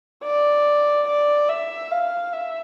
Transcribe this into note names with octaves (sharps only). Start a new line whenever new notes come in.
D5
D5
E5
F5
E5